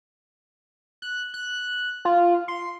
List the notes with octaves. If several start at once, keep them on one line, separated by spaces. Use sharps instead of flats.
F#6
F#6
F4
C6